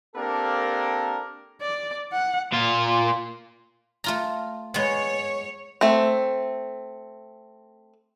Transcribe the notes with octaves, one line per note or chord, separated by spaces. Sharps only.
A#3 C4 D4 G4 A4 A#4
D5
F#5
A#2 F4
A3 F4 A#5
G#3 B3 C#5
A3 C4